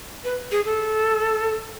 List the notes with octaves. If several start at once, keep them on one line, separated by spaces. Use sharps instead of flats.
B4
G#4
A4